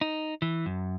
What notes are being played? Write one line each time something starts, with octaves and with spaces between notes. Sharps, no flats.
D#4
E3
F#2